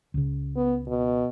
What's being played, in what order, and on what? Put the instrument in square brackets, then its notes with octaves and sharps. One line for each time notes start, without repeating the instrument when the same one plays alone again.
[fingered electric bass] C#2 C#3
[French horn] B3
B2